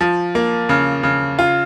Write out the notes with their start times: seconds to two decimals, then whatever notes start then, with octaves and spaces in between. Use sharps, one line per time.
0.01 F3
0.35 A#3
0.69 C#3
1.03 C#3
1.39 F4